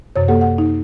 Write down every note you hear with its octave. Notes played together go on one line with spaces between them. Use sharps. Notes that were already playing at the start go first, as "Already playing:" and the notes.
F#2 C3 C#5
A#3 G4 A4 F#5
F#5
D#4